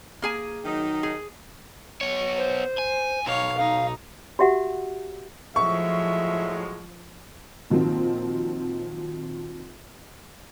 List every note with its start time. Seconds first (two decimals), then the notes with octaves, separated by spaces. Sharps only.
0.22 A#3 G#4 G#5
0.65 D#3 F#3 D#4
1.03 G#4
2.01 B3 C#5
2.38 C5
2.78 G#5
3.26 B1 C#5 F5
3.58 D#4 F5
4.39 F#4 G4 E5 F#5
5.56 A2 F3 F#3 G#3 E5 C#6
7.70 A#2 D#3 F3 F#3 C4